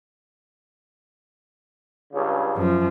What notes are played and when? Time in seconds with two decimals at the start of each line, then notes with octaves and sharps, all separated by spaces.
2.14 C#2 G2 C#3
2.55 F#2 F3